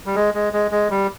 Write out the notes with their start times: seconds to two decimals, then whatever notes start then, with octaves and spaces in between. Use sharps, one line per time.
0.06 G3
0.16 G#3
0.34 G#3
0.53 G#3
0.71 G#3
0.90 G3